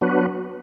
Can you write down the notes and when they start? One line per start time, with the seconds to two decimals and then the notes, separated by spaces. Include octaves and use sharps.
0.01 F#3 B3 D4 F#4 B4